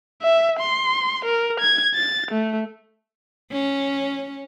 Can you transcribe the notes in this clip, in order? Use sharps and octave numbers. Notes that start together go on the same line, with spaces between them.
E5
C6
A#4
G#6
A6
A3
C#4